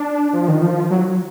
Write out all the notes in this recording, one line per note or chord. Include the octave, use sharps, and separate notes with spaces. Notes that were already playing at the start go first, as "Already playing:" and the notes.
Already playing: D4
F3
D#3
F3
F#3